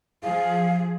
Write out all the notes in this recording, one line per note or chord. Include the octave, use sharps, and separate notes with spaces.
F3 G#4 F5